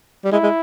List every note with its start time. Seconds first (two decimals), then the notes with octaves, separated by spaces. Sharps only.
0.24 G3
0.32 G#3 E4
0.43 G#3